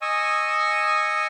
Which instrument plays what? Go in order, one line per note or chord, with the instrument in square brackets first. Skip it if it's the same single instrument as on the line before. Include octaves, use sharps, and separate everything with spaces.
[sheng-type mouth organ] D#5 G#5 C#6 D#6 E6